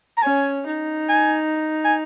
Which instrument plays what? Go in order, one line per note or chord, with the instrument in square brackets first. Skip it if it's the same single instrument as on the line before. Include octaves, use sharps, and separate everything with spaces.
[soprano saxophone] A#5
[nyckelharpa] C#4 [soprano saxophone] G#5
[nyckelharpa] D#4
[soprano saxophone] G#5
G#5